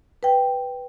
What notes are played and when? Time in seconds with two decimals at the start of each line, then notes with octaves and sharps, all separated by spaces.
0.23 B4 G5